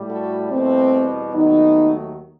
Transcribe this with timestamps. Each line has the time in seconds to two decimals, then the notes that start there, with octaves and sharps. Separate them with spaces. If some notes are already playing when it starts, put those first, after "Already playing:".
Already playing: A2 G3
0.10 F#4 A4
0.51 E2 B2 G3 A3 C4
1.33 D#2 D#3 F#3 A3 B3 D#4